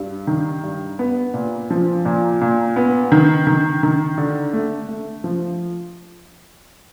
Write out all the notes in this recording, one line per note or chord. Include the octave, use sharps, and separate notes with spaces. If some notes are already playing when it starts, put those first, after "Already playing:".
Already playing: G2
D#3
G2
B3
A#2
F3
A#2
A#2
B3
D#3
D#3
D#3
D3
A3
A3
F3